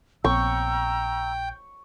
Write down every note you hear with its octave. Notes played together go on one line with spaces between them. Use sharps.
A#1 B3 C4 G5 A#5 C#6 E6